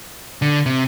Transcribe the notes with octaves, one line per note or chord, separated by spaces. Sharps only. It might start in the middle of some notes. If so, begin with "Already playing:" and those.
D3
C3